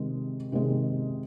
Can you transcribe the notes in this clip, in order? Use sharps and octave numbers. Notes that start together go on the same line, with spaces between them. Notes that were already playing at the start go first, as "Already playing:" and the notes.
Already playing: C3 D#3 G#3
C3 D#3 G#3